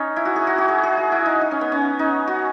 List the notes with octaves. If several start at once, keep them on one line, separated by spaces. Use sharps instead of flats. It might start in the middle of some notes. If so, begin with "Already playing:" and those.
Already playing: C#4 D#4
E4
F#4
G#4
F#4
F#4
G#4
G#4
F#4
E4
D#4
D#4
C#4
B3
C#4
D#4
F#4